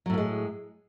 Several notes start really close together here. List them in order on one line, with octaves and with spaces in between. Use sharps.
F#3 A2 A#3 G#3